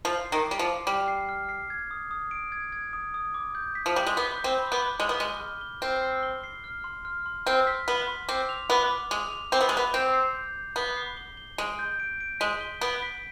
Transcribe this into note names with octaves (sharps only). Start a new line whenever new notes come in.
F3 C7
C7
D#3
G3 D6
F3
D6
G3 F6
C7
F6
C7
G#6
D#6
D#6
D7
G#6
G#6
D#6
D#6
D6
G6
B6
F3
G3 D6
G#3
B3 B6
G6
C4
B5
B3
D6
G#3 F6
B3
G#3 G7
F6
G7
C4 F6
C7
G7
C7
F6
C6
F6
C6
C4 F6
B6
B3 B6
C6
C4 D6
F7
B3 D6
D6
G#3 F7
F7
C4 D6
B3
G#3
B3 F7
C4 G6
C7
G6
G6
B3 G7
C7
G7
G7
G#3 D7
G6
D7
D7
G#3 B6
G7
B3 D7
B6